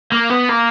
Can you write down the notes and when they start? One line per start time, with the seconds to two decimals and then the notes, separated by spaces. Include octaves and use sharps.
0.12 A#3
0.30 B3
0.49 A#3